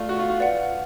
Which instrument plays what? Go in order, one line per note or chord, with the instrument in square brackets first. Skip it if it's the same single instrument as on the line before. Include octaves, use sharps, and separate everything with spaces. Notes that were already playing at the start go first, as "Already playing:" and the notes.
Already playing: [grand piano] A3 F4 [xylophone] D5 F5
[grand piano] F#4
F4
F4
[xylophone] B4 D5 F#5